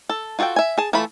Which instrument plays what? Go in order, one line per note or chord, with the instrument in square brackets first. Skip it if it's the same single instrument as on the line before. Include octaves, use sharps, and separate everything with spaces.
[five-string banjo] A4
F4 F#4 A4 D#5 G5
E5 G#5
G#4 A5
E3 A3 F4 A4 B5